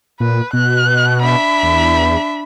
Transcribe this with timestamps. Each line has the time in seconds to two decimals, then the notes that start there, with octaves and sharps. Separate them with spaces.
0.20 A#2 B4
0.53 B2 F#6
1.22 D4 E5 B5
1.63 E2